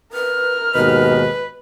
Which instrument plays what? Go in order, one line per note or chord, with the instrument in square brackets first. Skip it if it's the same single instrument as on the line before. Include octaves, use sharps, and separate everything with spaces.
[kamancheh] A#4 F6 [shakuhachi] B4
[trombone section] D#2 G#2 B2 [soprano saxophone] B4 [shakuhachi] D#5